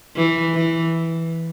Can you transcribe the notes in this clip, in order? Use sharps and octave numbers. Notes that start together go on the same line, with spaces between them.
E3
E3